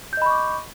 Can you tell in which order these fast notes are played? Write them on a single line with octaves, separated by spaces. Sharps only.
G6 D#5 B5 C#6 D6